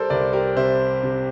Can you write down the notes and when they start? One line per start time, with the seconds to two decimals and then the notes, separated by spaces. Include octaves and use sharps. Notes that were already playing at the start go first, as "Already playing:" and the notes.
Already playing: G3 A4 A#4 C5 D5
0.10 C2 A#4 D5
0.33 G4 A#4
0.56 C3 C5 E5
1.03 C3